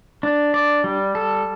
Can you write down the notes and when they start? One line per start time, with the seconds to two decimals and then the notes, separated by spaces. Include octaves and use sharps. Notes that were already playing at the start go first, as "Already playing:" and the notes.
0.23 D4
0.54 D5
0.84 G3
1.15 A4